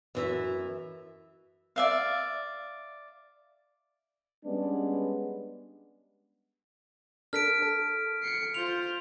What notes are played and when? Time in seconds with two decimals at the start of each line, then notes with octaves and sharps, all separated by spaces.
0.15 F#2 E3 E5
1.76 D5 E5 F5
4.45 G3 G#3 B3 C#4 D4
7.33 D4 A4 A#4 F6 B6 D7
7.62 A4
8.23 C7 C#7
8.54 F4 C5 F7